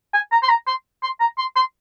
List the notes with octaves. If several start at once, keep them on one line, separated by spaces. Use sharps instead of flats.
G#5
A#5
C6
A#5
C6
C6
A#5
C6
C6